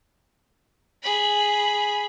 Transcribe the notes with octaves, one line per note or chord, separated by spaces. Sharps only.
G#4 B5